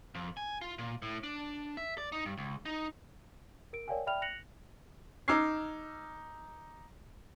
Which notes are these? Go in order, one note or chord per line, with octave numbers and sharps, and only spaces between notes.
F2
G#5
F4
A#2
A2
D4
E5
D5
D#4
G2
C#2
D#4
A#4 D7
A#4 C#5 D5 F5 G5 G#5
D5 E5 G5 B5 F6 F7
F#6 A#6 C#7 F7 F#7
D#4 D6 E6 F6 G#6 C7